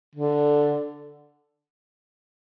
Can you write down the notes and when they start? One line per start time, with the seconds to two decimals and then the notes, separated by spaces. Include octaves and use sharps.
0.16 D3